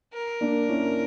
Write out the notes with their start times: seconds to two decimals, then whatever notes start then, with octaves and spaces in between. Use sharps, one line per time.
0.14 A#4
0.41 A#3 D4
0.69 C#4 E4